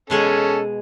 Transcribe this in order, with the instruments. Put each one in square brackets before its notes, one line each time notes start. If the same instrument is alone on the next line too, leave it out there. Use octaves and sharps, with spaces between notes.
[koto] B2 G#3 G#4 [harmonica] C#4 A4